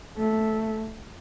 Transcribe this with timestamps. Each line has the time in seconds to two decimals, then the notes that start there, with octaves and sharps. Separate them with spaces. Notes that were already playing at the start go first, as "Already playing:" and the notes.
0.17 A3